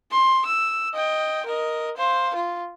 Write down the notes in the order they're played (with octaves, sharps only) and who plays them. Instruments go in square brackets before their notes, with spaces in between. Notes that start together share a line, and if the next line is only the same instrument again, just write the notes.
[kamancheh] C6
E6
D#5 G5
A#4 D#5
C5 F5
F4